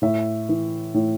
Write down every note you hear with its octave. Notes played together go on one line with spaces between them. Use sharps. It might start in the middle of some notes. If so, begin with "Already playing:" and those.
A2 E5
E3
A2